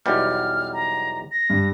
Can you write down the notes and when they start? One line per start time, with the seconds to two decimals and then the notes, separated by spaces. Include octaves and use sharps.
0.06 B1 E2 G3 F6
0.73 A#5
1.31 A#6
1.50 G2